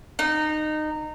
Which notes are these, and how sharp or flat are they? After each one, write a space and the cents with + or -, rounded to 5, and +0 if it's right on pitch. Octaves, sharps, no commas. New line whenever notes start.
D#4 -20